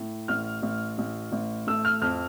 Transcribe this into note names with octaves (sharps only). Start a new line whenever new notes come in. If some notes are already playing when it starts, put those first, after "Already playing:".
Already playing: A2
A1 F6
A1
A1
A1
A3 E6
F6
F2 F6